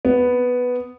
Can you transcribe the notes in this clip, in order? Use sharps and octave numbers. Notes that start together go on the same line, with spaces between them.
B3